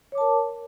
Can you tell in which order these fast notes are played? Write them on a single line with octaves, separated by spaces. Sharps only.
C#5 D6 A5 A#4